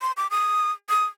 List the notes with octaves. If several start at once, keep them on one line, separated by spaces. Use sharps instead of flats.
C6
D6
D#6
D#6